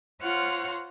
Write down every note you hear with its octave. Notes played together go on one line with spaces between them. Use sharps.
F4 C5 C#5 F#5 A#5 F6